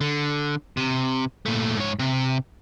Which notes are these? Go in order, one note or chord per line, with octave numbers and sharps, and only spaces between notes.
D3
C3
A#2 A3
G#2 C#5
C3